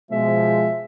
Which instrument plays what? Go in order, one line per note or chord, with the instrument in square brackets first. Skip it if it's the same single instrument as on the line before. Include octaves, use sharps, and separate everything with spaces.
[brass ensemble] B2 F3 G#3 [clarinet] E5